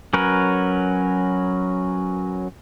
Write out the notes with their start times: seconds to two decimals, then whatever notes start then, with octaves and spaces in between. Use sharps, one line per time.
0.13 F#3 C#4 A#4 B4